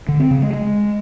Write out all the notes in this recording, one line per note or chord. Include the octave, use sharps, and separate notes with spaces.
D3
C4
C#3
G#3
G#3